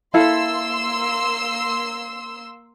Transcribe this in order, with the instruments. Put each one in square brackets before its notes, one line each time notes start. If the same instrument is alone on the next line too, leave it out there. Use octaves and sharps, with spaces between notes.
[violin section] A#3 C6 E6 [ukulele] E4 A4 F5